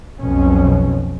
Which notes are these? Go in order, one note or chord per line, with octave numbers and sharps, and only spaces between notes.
B1 F2 B2 C#4